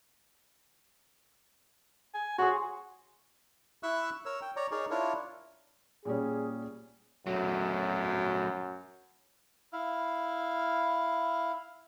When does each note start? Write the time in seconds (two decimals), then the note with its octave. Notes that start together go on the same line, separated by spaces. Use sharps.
2.14 G#5
2.38 F#4 G#4 C5 C#5
3.83 E4 E5 C#6 E6 F#6
4.25 A#4 C#5 E6
4.42 G5
4.56 C#5 D5 A#5
4.71 D#4 G#4 A#4 C#5 D5
4.91 D4 E4 F4 A#4 C#5
6.05 A#2 G3 C#4 G#4
7.27 F#2 F#3 A3
9.73 E4 F5